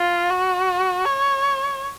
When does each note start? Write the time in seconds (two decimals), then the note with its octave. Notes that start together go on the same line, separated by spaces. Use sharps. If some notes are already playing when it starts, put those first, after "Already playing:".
Already playing: F4
0.30 F#4
1.06 C#5